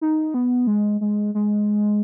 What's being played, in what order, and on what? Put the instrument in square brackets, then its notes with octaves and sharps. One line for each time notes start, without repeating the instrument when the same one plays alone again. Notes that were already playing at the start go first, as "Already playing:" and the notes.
[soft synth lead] D#4
B3
G#3
G#3
G#3